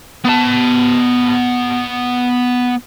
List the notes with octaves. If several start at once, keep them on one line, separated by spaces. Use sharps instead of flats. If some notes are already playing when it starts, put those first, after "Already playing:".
B3 A5